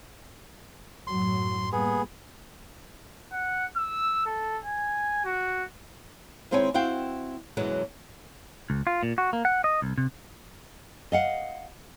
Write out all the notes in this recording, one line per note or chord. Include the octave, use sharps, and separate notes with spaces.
F#2 A2 F#3 C6
A2 G3 A#3 B3 G#4
F#5
E6
A4
G#5
F#4
D#3 G#3 C4 E4 C#5 G#5
C4 E4 F#4 F5 G5
F#2 B2 E3 F#3 G#3
C#2
F4
A#2
F#4
A#3
F#5
D#5
C2
C3
D#5 F5 F#5